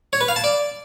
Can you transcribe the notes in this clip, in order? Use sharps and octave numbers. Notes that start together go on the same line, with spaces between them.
C#5
B4
F5
A5
D5